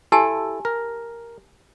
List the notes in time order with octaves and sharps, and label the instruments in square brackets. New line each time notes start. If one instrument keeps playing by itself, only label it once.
[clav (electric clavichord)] E4 A4 [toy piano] G4 G#5 A5
[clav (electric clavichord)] A#4